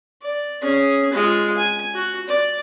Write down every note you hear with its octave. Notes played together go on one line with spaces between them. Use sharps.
D5
C#4 G#4
G#3 F4
G#5
F#4
D5